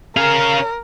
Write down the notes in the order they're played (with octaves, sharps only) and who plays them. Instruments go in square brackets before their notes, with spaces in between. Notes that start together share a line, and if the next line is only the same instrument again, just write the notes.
[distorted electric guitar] C#4 F5 [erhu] A#4